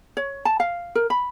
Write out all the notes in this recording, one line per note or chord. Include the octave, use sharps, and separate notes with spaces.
C#5
A5
F5
A#4
B5